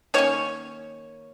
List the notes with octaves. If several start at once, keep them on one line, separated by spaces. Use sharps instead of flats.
D#3 A#3 C#4 C#5